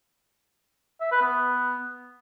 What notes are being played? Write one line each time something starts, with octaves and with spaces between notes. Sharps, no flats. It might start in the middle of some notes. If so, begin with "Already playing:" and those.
E5
B4
B3